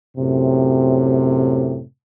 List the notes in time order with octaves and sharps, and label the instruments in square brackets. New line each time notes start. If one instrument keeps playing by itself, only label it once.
[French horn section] F#2 A2 C3